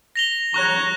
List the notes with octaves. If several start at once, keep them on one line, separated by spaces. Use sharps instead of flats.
A#6 F7 G7
C#5 A#5 C#6 F#6